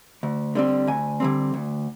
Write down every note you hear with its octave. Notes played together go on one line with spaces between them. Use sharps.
D2
D3 G3 C4
D2 G#5
D3 G3 C4
D2